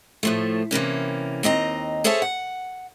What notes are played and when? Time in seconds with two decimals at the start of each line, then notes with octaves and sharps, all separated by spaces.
0.23 A2 F3 A3
0.71 C3 E3 A#3 C#4
1.43 D#2 C4 D#5 A#5
2.04 G#4 A4 C5 C#5 E5 A5
2.22 F#5